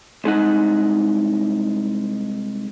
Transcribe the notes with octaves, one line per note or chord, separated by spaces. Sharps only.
C2 G#3 D#4 F#5